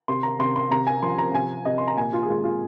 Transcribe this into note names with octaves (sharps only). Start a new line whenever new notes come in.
C3 C6
A#5
C3 C6
C6
C3 A#5
G#5
F3 C6
A#5
C3 G#5
C3 D#5
C6
A#5
A#2 G#5
F4
G#4
G#3 F4
F4